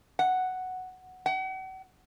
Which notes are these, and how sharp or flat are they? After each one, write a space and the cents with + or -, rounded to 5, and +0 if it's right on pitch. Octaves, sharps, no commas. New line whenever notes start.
F#5 +0
F#5 +40